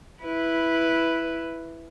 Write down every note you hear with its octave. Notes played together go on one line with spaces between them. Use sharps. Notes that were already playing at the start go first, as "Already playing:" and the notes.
E4 B4